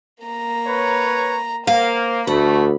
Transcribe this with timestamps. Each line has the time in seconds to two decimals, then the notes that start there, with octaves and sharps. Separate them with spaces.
0.24 A#3 A#5
0.67 B4 C#5
1.67 A#3 C5 F5
2.27 D2 A3 F#4 B5